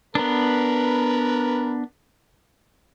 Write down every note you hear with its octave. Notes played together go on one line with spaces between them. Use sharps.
B3 D4 A#4 B4